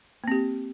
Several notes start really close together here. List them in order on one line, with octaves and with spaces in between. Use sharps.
A#3 C4 G4